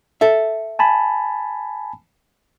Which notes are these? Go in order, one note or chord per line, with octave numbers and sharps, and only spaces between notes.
A4 E5
G#5 A5 B5